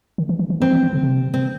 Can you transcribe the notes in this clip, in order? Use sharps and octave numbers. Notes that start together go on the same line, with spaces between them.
D#3
E3
E3
E3
E3 C4
E3
E3
C#3
C3
C4